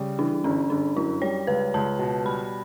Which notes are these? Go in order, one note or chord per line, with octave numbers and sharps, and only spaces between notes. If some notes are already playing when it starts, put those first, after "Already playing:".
Already playing: C#3 G3
E3 D4
G1 C#4
G1 D4
F#2 E4
G3 C#5
C#2 B4
C#2 A5
B2
G3 B5